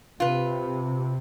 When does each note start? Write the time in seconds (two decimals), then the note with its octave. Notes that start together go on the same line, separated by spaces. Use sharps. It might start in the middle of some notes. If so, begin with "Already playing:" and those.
0.20 C3 F4 B4